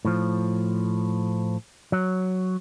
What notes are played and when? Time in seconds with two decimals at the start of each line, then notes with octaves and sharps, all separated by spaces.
0.05 A2 F3
1.92 F#3